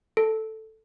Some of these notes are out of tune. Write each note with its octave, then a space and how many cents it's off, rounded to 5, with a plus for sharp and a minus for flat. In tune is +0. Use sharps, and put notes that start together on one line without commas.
A4 +0